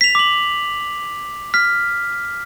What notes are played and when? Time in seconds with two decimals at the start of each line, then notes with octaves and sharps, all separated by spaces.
0.01 B6 F7
0.15 D6 F#7
1.54 F6 B6